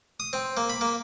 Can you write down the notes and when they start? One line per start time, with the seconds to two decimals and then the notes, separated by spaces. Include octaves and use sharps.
0.20 D#6
0.33 C4
0.57 A#3
0.69 B5
0.81 A#3